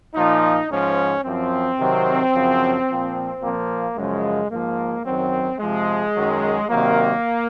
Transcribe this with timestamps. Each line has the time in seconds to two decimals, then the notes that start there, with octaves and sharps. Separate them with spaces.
0.15 A#2 F3 D#4
0.69 G#2 F3 C#4
1.24 F#2 F3 C4
1.78 C3 D#3 F#3
2.33 F#2 C#3 F3
2.88 A#2 F3
3.42 A#2 F3 A#3
3.96 F#2 C#3 F3 G#3
4.51 G#2 F3 A#3
5.05 F#2 D#3 F#3 C4
5.60 C3 F3 G#3
6.14 F#2 D#3 F#3
6.69 C3 D#3 F#3 A#3